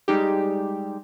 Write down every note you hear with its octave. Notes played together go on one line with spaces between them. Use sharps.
G3 G#3 D#4 G4